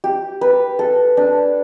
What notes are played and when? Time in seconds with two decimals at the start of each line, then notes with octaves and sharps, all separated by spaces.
0.04 G4
0.41 B4
0.79 A4
1.17 D4